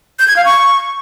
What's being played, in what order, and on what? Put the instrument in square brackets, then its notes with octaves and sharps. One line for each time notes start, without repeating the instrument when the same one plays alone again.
[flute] G6
G#6
F5
C#6